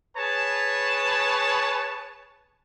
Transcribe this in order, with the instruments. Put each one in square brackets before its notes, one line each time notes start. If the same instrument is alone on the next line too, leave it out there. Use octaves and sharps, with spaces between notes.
[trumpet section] G#4 B4 C#5 A5